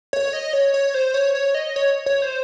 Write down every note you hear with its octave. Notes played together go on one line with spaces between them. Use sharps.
C#5
D#5
C#5
C#5
C5
C#5
C#5
D#5
C#5
C#5
C5